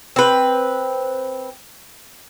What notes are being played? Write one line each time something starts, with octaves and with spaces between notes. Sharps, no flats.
C4 B4